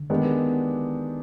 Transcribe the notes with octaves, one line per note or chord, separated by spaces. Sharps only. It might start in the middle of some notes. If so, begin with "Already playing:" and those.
Already playing: D3
D#3 G#3 B3 D4 G4